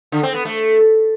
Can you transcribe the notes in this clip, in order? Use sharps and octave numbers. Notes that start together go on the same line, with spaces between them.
D3
C4
B3
A3